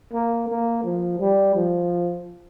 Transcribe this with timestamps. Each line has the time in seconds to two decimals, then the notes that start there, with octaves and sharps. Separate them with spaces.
0.13 A#3
0.49 A#3
0.84 F3
1.20 G3
1.55 F3